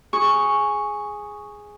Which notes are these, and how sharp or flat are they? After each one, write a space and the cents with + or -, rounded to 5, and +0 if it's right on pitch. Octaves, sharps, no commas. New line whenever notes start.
G#4 +0 C#6 +0